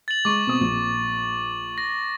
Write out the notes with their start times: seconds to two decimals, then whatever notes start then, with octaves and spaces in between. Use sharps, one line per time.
0.08 A6 F#7
0.25 G#3 C#6 D6
0.46 B2 C4 D#6
0.61 A#1
1.78 A#6